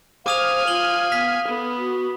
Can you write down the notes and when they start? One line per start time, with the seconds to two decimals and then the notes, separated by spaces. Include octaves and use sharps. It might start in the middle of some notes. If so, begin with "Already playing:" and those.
0.26 C5 F5 G#5 D6 D#6 F6 F7
0.67 F4 F#7 G7
1.12 B3 B6
1.48 B3 A4
1.77 F#4